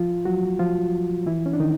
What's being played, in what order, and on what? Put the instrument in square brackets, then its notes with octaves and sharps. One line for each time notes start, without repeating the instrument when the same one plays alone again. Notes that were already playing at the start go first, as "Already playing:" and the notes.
Already playing: [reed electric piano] F3 F4
F#3 F#4
F3 F4
E3 E4
C#4
D4
D#3 D#4